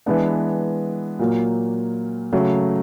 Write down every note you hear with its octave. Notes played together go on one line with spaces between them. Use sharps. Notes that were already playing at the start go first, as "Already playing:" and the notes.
E3 G#3 B3 D4
A#2 F#3 A#3
C#3 F#3 A3